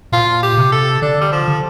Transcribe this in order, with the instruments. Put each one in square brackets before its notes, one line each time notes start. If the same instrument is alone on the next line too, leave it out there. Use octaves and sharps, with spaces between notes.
[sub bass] A#2 [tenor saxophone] F4
[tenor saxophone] G4
[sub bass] C3
[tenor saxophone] A4
[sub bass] D3 [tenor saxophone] D4
[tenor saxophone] G3
F3
[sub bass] D3